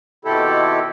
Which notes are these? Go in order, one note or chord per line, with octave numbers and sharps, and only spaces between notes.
B2 D#3 C4 E4 G4 A4